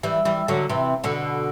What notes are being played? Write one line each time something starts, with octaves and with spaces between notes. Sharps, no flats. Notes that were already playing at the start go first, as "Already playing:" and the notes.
E3 G3
E3 G3
D3 F#3
C3 E3
B2 D3